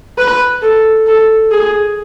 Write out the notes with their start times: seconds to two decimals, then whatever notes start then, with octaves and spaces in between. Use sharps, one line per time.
0.18 B4
0.62 A4
1.07 A4
1.51 G#4